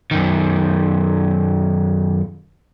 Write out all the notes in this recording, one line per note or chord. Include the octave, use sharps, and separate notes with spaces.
F#2 D#3